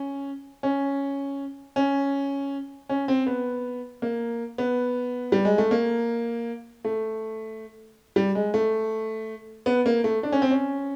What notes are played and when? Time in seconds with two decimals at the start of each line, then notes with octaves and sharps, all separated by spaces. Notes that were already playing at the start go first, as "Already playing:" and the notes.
Already playing: C#4
0.63 C#4
1.76 C#4
2.89 C#4
3.08 C4
3.26 B3
4.02 A#3
4.58 B3
5.32 G3
5.45 G#3
5.58 A3
5.71 A#3
6.84 A3
8.16 G3
8.35 G#3
8.54 A3
9.66 B3
9.86 A#3
10.04 A3
10.23 D4
10.32 C#4
10.42 C4
10.51 C#4